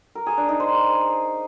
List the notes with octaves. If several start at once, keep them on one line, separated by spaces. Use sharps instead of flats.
A#4
G#4
D4
D#4
C5